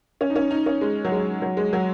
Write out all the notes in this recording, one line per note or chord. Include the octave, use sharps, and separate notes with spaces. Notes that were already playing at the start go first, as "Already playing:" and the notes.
C#4
D#4
C#4
D#4
C#4
G#3
F#3
G#3
F#3
G#3
F#3